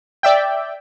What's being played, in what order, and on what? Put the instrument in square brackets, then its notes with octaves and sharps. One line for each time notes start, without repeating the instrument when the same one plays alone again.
[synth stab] D5 E5 G5